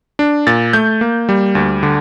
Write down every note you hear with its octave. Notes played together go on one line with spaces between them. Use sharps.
D4
A#2 A6
A3 G6
A#3
G3
D2
D3